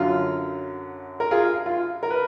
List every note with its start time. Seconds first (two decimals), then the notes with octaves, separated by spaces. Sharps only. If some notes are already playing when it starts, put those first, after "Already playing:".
Already playing: F#2 D3 F#3 F4
1.20 A#4
1.31 F4 G#4
1.66 F4
2.03 A#4
2.10 B4